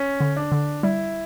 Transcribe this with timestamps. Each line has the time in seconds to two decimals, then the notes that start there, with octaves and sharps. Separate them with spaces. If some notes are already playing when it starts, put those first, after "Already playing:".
Already playing: C#4
0.20 D3
0.36 D4
0.52 D3
0.83 G3 E4